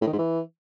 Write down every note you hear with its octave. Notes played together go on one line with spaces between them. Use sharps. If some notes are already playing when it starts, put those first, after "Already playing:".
A2
D#3
G#2
E3